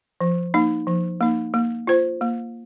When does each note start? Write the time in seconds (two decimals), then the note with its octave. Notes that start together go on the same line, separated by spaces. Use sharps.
0.20 F3
0.54 A#3 D#4
0.87 F3
1.21 A#3 D#4
1.54 A#3
1.87 F4 C5
2.21 A#3